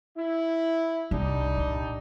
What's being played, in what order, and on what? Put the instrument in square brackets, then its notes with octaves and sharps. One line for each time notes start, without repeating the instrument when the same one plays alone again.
[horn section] E4
[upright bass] C2 [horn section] G3 D4 D#4
[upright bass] A#2